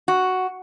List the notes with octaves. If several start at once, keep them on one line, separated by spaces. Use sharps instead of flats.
F#4